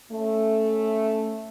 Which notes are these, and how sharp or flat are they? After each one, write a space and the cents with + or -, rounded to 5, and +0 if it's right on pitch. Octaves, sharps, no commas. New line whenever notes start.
A3 +0 C#4 -5